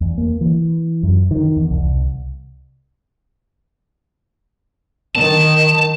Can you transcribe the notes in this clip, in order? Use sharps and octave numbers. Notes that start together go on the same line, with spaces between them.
E2
A#3
E3
F#2
D#3
E2
C2
D#3 A5